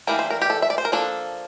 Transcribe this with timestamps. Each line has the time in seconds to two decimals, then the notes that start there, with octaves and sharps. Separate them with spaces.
0.07 E3 G3 A#3 D4 A#4
0.19 C5
0.30 A#4
0.42 G4
0.50 A4
0.62 E5
0.70 D5
0.78 C5
0.85 A#4
0.92 F3 A#3 D4 A4